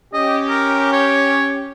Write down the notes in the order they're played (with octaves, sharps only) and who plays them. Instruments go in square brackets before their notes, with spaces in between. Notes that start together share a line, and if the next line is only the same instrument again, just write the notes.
[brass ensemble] C#4 G4 [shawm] D#5
[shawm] A#4
C#5